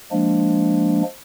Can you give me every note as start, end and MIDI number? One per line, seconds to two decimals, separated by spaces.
0.12 1.02 53
0.12 1.02 56
0.12 1.02 58
0.12 1.02 62